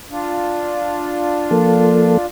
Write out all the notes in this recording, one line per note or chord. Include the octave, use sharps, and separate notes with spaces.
D4 F4
F3 A#3 A4